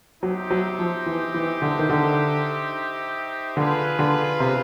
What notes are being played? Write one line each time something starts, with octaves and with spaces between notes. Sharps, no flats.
F#3 D#4 G4 C5 E5
F#3
F3
E3
E3
D3
D#3
D3
D3 F4 G#4 B4
D3
C3